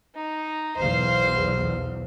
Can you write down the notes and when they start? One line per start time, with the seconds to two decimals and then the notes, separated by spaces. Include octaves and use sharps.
0.16 D#4
0.76 B1 E2 C5 F5